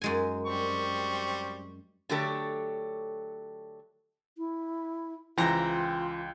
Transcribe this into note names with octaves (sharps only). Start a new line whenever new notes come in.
F#2 G#3 G#5
G3 C4 C#6
D3 F#3 A3 G4 A4 C#5
E4
C#2 E3 F4 C5 G5 A#5